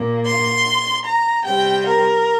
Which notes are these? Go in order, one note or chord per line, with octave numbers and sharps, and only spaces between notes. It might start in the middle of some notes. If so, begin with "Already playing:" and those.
Already playing: A#2 A#3
C6
A#5
C3 G3 C4 G5
A#4